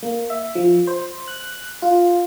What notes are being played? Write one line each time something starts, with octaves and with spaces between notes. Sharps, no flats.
A#3
E5
F3
C5
F#6
F4